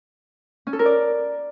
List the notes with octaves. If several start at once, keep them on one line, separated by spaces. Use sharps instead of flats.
C#4
A4
A#4
D5